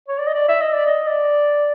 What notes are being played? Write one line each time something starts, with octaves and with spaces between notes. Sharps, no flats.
C#5
D5
D#5
D5
E5
D#5
D5
D#5
D5